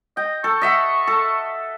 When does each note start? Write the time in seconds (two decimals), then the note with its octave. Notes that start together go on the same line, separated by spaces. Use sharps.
0.17 D#5 G5
0.44 A4 C#6
0.62 D#5 E5 F#5
1.07 A4